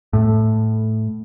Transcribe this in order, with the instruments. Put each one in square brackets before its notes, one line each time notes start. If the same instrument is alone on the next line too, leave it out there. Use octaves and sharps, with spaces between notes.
[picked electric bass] A2